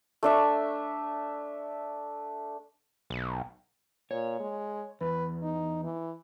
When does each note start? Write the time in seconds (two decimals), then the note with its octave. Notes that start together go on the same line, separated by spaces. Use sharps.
0.23 A3 D4 E5
3.10 B1
4.11 A#2 C#5
4.40 G#3
5.01 E2 B4
5.42 D#4
5.84 E3